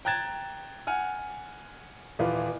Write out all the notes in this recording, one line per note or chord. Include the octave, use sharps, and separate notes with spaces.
G5 A#5 F#6 G#6 A6 E7
F#5 G#5 F6
D#1 E3 F4 B4